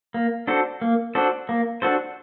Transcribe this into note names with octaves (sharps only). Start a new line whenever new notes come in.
A#3
D4 F#4 A4 C5
A#3
D4 F#4 A4 C5
A#3
D4 F#4 A4 C5